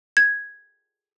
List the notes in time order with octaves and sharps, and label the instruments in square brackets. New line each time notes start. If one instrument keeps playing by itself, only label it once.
[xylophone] G#6